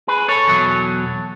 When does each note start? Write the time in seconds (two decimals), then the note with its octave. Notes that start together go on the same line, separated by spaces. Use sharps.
0.08 G#4 B4
0.28 A4 C#5
0.48 E2 B2 F#3